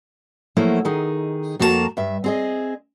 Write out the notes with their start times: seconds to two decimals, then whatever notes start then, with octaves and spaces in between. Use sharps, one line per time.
0.56 F3 F#3 A3 A#3 E4
0.85 D#3 D#4 G#4
1.59 F2 A#3 F#4 G4 A5 A#5
1.97 G2 E5
2.24 C4 G#4 D#5